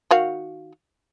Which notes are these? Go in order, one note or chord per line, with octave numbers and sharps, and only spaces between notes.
D#3 F#4 F5